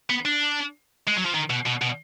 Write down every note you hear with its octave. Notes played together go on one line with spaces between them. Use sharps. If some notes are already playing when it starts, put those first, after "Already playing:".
B3
D4
G#3
F#3
F3
D#3
B2
B2
B2